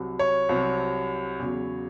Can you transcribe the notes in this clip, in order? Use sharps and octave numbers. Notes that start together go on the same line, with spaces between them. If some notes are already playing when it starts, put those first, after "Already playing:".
Already playing: C2 C3 F#3
C#5
C2 C3 F#3
E2 C#3 F#3